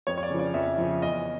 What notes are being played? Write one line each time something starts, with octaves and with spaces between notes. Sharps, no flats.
F2 C#5
C#5
D5
C#3 F3
D5
F2 E5
C#3 F3
E2 D#5